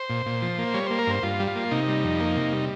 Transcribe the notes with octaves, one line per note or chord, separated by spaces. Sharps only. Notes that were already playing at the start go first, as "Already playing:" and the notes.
Already playing: C5
A#2
A#2
F3
A#3
G3 C#5
A#3 C5
A#4
G2 C5
G2 F4
G3
F4
A#3
C3 D#4
G3
F2
A#3
C3
G3